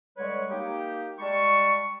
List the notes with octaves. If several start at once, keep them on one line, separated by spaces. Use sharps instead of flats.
D3 G3 G#3 B4 C#5
A#3 D#4 G4
G3 G#3 A5 B5 C#6